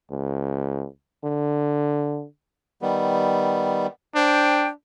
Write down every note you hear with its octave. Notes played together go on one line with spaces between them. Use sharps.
C#2
D3
D#3 G3 B3
D4 C5 G5